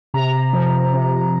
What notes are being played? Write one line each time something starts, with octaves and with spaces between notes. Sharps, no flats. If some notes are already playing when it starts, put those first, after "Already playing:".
C3 A#5
F3
C3